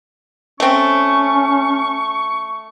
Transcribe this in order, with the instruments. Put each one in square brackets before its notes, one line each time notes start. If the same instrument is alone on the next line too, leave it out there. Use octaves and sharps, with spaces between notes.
[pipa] A3 C4 [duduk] C#4 [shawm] C#6